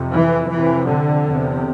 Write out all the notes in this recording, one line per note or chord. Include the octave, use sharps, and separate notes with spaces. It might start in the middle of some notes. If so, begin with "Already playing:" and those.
Already playing: F2 C3
E3
F2 C3 E3
D3
E2 C3